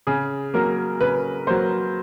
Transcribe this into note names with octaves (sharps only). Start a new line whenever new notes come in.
C#3 G#4
F#3 A#3 A#4
C#3 B4
F#3 A#3 C5